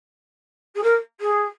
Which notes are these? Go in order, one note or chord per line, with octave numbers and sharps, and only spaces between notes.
G#4
A#4
G#4